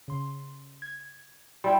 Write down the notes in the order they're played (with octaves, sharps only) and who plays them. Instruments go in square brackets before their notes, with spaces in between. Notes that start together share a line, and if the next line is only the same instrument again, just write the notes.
[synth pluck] C#3 C6
G#6
[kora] G3 E4 [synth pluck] G5 C6